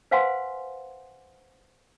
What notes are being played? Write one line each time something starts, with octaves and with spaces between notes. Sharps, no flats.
B4 C5 F5 F#5 G#5 C6